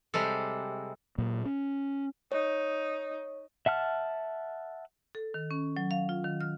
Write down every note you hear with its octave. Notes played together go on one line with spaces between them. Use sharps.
C3 G3 G#3 A4
A#2 F#3 A#3
C#4
D#4 C#5
E5 F#5 A5 F6
A4
D#3
C#4
F#3
F5
F4
D#3
F6